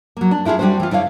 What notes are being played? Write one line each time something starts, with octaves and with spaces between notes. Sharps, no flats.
F#3 A#3
D4
D4 E4 F4 G4 G#4
G3 C4 D4 F#4 C5
E3 F4
D3 E4 C#5 F5